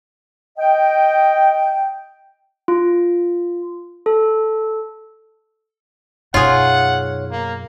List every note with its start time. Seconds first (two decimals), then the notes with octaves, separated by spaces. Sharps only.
0.58 D#5 G5
2.68 F4
4.06 A4
6.34 F#2 B2 D#4 F4 G#4 C#5 F#5
7.31 A#3